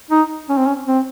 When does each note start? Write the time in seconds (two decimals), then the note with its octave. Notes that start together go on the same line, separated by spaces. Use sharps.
0.11 D#4
0.49 C#4
0.57 C4
0.66 C#4
0.87 C4